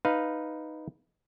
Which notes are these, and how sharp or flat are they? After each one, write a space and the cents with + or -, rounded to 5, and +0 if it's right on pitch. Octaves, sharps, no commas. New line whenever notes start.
D#4 +0 B4 +0 F5 +0